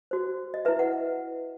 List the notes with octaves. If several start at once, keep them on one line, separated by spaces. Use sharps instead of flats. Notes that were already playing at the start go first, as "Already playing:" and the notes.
F#4 C5
D#5
E4 B4 E5
F#5